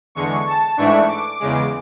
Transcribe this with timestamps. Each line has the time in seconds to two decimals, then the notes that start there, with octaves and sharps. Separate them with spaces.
0.15 E2 D3 G#3 C#6
0.47 A5
0.77 G#2 E3 A3 D4 C#6
1.08 D6
1.40 E2 C#3 G#3